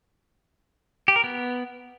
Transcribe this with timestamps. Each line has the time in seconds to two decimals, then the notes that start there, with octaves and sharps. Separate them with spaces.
1.08 G4
1.16 A#4
1.24 B3